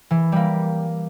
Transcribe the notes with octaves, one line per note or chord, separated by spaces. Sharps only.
E3
G3 A#3